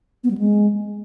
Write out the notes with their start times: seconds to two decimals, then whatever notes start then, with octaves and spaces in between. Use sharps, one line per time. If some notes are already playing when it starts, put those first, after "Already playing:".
0.24 B3
0.31 G3
0.38 G#3